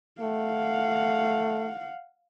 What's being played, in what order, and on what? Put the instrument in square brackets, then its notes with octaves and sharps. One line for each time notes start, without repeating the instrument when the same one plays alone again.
[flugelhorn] A3 [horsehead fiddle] F5 F#5